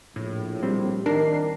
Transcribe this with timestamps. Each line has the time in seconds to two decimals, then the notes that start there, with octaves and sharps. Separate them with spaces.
0.16 A#1 A2
0.63 G3 C4
1.06 D#3 D4 A#4 C7